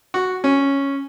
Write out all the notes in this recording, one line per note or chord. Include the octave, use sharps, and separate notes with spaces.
F#4
C#4